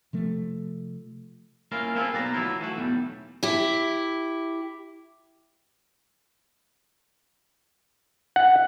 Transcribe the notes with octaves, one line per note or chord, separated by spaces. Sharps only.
C3 F3 A3
A#3 C#4 E4 F4 A#4 F5
A#3 C4 E4 F4 G#4 A4
B1 B4 D5 A#5
E3 F#3 A3 E4 F4
E3 A3 F#4
B1 E2 A2 G3
E4 G4
F#5